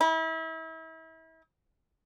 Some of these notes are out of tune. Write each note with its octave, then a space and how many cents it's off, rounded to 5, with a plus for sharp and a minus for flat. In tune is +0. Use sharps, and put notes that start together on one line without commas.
E4 -35